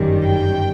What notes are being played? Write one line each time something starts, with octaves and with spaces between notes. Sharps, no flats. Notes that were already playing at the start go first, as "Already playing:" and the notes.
Already playing: G1 F#2 D#3 G3
G5